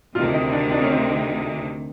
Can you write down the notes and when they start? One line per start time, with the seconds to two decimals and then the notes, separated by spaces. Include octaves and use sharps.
0.15 D2 C3 D#3 F4
0.34 D#4
0.52 D4
0.72 D4
0.82 C#4
0.90 C4